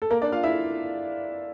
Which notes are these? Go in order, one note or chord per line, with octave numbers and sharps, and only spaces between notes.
A4
A#3 A#4
D4 D5
F4 F5
E4 E5